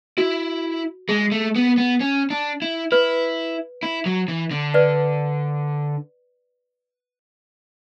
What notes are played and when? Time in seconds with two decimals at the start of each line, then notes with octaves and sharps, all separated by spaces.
0.18 E4 F#4
1.09 G#3 G#4
1.32 A3
1.56 B3
1.78 B3
2.00 C#4
2.30 D4
2.62 E4
2.92 E4 B4
3.83 E4
4.06 F#3
4.28 E3
4.51 D3
4.74 B4 D5